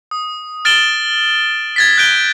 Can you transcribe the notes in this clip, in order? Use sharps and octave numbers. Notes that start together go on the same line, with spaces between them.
D#6
F6 A6 D7 E7 F#7 G7
G#6 A6 B6
F#6 G6 D7 G7